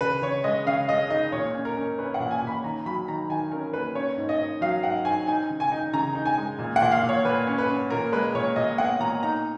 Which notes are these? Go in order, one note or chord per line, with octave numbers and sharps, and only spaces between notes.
C#3 B4
C#3 C#5
G#3 D#5
C#3 F5
G#3 D#5
D#4 D#5
A#2 C#5
C#4
A#4
C#4
C#4 B4
F#5
A#2
G#5
A#2
B5
D#3 A#5
F#3 B5
D#3 A#5
D#3 G#5
C#4 A#4
A#3 B4
C#4 C#5
G#2
D#5
G#2
F#3 F5
G#2 F#5
G#2 G#5
D#4 G#5
C#3
G#5
D#4
C#3 A#5
D#4
G#5
G#3
A#2
F#5
A#2
F5
A#2
C#5
A#2 B4
C#4
B4
C#4
A#2 A#4
G#3 B4
A#2 C#5
A#2 D#5
B3 F#5
A#2 A#5
D#4 A#5